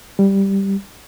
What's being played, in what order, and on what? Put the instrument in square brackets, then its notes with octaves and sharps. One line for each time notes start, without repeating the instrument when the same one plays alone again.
[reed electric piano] G3